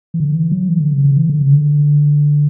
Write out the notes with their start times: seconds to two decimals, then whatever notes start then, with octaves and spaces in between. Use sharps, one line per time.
0.14 E3
0.20 D3
0.35 E3
0.52 F#3
0.69 E3
0.80 D3
0.93 C#3
1.04 C#3
1.17 E3
1.29 D3
1.41 C#3
1.53 D3